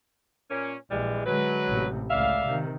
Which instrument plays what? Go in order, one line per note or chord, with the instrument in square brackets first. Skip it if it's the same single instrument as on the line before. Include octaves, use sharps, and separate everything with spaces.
[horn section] A#2 A#3 C#4
[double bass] A#1 [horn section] E3 G3 G#3
[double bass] D3 G#3 [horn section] F#3 B4
[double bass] A1 C3
[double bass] C#2 A2 [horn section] D5 E5 F5
[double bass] C3 D#3